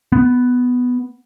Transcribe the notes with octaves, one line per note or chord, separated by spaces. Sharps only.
B3